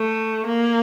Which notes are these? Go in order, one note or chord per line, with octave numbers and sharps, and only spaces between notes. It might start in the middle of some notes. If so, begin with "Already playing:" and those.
Already playing: A3
A#3